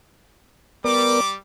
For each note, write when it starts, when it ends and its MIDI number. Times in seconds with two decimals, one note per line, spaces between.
0.84 1.33 55
0.84 1.21 59
0.84 1.21 70
0.84 1.21 74
0.84 1.33 86